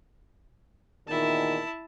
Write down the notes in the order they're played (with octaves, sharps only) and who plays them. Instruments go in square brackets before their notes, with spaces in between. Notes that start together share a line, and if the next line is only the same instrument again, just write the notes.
[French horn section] E2 A#2 D#3 [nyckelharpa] E4 A5